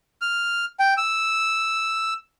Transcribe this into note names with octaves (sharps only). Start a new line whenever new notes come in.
F6
G5
E6